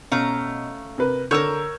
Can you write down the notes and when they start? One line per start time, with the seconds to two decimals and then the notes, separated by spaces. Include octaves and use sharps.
0.12 B2 A3 C#4 F5 A#5
0.98 C3 A#4 B4
1.31 D3 A#4 C#5 E6 F6 G6